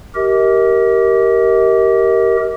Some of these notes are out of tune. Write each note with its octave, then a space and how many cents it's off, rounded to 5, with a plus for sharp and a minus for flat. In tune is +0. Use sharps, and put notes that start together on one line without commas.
G4 -20 A#4 +0 D#5 +45